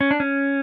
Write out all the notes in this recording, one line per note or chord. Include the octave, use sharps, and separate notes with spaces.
C#4
D4
C#4